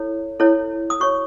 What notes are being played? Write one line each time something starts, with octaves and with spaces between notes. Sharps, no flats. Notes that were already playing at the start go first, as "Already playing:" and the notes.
Already playing: E4 A4 C#5
E4 A4 C#5
D#6
F#4 C#5 C#6